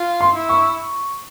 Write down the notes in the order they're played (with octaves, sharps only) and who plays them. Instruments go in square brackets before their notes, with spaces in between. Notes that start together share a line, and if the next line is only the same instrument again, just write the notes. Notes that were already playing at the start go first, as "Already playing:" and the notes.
Already playing: [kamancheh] F4
[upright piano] C6
[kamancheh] E4
[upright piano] C#6